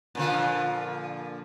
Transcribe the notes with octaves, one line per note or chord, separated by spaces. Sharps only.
A#2 D3 F3